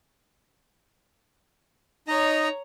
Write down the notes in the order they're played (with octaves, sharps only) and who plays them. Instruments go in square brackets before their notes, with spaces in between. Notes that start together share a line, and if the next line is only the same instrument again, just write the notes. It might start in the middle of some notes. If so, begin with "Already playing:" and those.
[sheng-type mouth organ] D#4 D#5 [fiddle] C#5 A#5